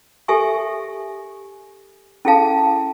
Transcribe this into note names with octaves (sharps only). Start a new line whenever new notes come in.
G4 A4 E5 G#5 C#6
C#4 E4 G#4 A4 F5 A5